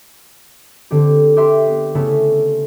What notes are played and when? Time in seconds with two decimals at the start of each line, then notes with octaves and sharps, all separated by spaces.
0.91 D3 C4 G4
1.37 G4 B4 E5 G5 C6
1.66 B3
1.95 C#3 A3 B3 E4